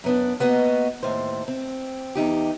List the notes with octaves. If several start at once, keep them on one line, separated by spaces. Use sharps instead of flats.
F#2 B3 D4
A#3 B3 F#4 D#5
D#2 A2 C5
C4
E2 D#4 G4